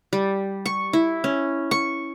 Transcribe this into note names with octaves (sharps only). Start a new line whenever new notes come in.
G3
C#6
E4
C#4
C#6